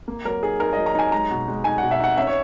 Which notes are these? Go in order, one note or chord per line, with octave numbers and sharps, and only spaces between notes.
A#3
F#3 A#4
D#4 G#4
D#4 A#4
D#5
F#3
A#5
D#4 G#5
G#3 A#5
B2
G#3
D#4 G#5
B2 F#5
E5
D#4 F#5
C#4 E5
C#5